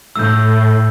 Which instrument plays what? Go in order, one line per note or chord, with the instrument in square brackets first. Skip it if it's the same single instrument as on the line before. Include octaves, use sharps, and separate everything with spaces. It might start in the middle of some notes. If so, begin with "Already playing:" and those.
[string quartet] A2 [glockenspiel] E6 G6